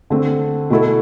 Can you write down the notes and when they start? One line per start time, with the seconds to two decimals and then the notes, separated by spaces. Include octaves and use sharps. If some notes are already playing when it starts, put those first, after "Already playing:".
0.10 D3 A3 C4
0.70 B2 A3 E4 A4